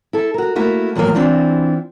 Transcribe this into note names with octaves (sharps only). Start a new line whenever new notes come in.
E4 A4
F#4 A#4
A3 A#3 E4 F#4
E2 A2 D#3 F#3 A#3
E3 C4 D4 E4 F4